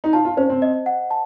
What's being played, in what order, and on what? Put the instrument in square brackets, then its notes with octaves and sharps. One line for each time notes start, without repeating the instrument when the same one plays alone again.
[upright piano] D#4
[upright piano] F4 [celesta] A5
[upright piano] F4
[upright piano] C#4 [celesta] C5
[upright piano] C4
[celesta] D#5
F#5
A5